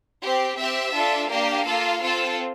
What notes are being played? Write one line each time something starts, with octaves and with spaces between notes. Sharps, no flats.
C4 G4
C4 G4 E5
D4 F4 A4
A#3 D4 G4 F5
A#3 F4 A4
C4 F4 A4